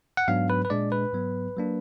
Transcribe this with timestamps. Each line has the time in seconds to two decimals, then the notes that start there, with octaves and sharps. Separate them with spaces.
0.17 F#5
0.28 G#2 F#3 B3 D4 F5
0.50 B4
0.65 B4
0.70 A#2 G#3 D4 D5
0.92 B4
1.13 G#2 F#3 B3
1.56 F#3 A#3 D4